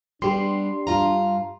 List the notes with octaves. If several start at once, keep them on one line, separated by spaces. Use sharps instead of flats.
G3 B3 D4 G4 C6
G2 F4 A#5